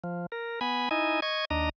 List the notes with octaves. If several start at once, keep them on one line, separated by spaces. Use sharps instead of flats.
F3
A#4
B3 G#5 B5
D#4 E4 D#5 G#5
D#5 C#6 G#6
D#2 D4 D#5 A#5